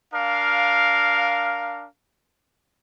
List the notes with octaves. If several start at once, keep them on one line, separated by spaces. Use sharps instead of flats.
D4 A#4 F5